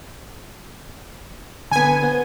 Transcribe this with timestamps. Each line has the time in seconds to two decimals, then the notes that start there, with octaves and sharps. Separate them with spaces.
1.71 D3 B3 G#5
2.03 B3 C5